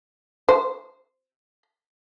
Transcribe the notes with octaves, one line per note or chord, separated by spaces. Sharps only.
C5